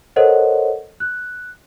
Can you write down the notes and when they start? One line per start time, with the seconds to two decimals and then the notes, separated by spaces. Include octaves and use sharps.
0.16 A4 A#4 C5 C#5 D#5 F#5
1.00 F#6